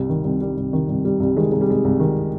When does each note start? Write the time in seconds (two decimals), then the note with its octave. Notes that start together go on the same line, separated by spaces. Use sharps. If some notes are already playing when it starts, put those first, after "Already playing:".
Already playing: C2 C3 G3
0.10 D#3
0.24 C2
0.40 C3 G3
0.57 C2
0.73 D#3
0.88 C2
1.05 C3 G3
1.20 C2 G3
1.37 D#3 G#3
1.52 C2 G#3
1.61 G3
1.69 C3 G#3
1.84 C2
2.00 D#3